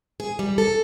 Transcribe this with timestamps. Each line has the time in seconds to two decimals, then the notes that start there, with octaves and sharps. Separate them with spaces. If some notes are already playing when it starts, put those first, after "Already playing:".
0.20 G#4
0.39 G3
0.58 A4